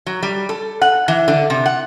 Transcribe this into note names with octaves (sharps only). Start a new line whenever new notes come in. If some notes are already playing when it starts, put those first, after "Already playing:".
F#3
G3
A4
F#5
E3
D3
C3
F#5